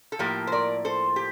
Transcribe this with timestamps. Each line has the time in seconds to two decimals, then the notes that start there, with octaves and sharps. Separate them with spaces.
0.12 A4
0.19 A2 F3 A#3 G4 A#4
0.47 C5
0.52 A#4 D5
0.85 A4 C5
1.16 G4